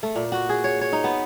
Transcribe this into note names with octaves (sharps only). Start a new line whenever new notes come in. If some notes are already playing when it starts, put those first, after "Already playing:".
A3
A#2
F#4
G#4
C#5
C#5
D#4
B3